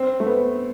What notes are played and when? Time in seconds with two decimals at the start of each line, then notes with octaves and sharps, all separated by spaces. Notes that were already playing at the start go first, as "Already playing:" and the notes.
Already playing: C4
0.20 A3
0.27 B3